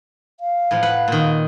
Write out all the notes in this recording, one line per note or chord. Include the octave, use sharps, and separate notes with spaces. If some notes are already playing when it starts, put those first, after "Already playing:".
F5
A2 F3
B4 F#5
A#2 D#3